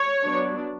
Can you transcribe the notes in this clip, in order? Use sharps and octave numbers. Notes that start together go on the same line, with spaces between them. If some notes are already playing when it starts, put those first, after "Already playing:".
Already playing: C#5
F#3 B3 D4